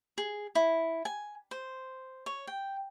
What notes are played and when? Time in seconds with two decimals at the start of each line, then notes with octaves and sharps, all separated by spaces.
0.18 G#4
0.55 E4
1.05 G#5
1.51 C5
2.26 C#5
2.47 G5